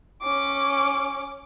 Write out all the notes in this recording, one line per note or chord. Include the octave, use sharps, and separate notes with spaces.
C#4 D6